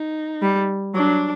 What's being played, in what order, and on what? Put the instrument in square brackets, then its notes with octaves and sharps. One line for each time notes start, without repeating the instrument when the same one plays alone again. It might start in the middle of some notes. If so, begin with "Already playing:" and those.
Already playing: [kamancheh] D#4
[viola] G3
[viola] F#3 [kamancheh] D4